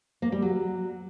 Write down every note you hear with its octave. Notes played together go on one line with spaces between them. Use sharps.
A#3
G3
F#3